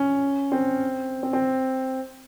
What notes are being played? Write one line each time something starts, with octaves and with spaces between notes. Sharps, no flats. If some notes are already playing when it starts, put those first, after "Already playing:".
Already playing: C#4
C4
C4
C4